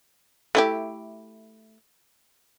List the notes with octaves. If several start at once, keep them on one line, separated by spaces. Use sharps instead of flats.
A3 E4 G4